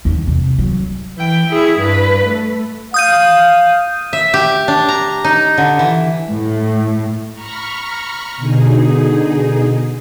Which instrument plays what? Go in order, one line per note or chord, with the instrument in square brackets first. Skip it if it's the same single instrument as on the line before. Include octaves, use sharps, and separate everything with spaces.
[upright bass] E2 D#3
C3
F#3
[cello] E3 G5
E4 G#4
G2 B4
A3
[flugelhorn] F5 [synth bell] D#6 G6 D#7
[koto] E5
G4
D4
A#5
D#4
D3
E3
[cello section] A2
[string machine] A#5 B5 C#6 F6
B2 D3 D#4 G#4